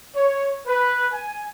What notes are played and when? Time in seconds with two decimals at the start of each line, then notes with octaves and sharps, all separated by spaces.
0.15 C#5
0.67 B4
1.13 G#5